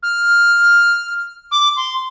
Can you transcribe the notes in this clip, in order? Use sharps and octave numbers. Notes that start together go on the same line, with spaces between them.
F6
D6
C6